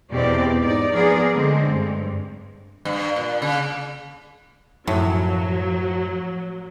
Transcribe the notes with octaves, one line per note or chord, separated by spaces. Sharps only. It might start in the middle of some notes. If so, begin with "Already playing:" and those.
E2 B2 C4 G4 D5
G#2 D#4 D5
F3 B3 G#4 A#4 D5
D3 G#3 A3 C4
G2
G2
A#2
C#3
F#2 A2 F3 F#3